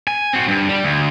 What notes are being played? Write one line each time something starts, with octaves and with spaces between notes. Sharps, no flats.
G#5
C4 F#4
G2
G3
D2